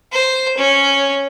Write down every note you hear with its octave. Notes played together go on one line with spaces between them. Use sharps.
C5
C#4